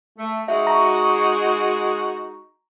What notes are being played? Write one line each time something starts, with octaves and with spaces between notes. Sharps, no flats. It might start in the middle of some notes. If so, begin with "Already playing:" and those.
A3
G#3 D#4 F#4 E5
A#5 C#6 A#6